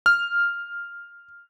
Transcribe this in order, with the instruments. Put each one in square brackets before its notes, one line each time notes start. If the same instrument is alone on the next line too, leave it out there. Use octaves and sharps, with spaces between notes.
[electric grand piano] F6